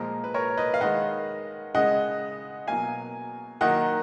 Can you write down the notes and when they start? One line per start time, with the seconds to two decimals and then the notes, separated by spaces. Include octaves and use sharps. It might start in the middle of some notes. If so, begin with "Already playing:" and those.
Already playing: A#2 F3 G#3 A#4
0.24 B4
0.34 A#4 C#5
0.57 B4 D#5
0.74 F5
0.81 D#3 G#3 D#5 F#5
1.75 C#3 G#3 D#5 F#5
2.67 B2 F#3 A#3 F5 G#5
3.61 D#3 F#3 A#3 D#5 F#5